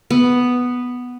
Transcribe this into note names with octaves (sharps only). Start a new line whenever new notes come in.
B3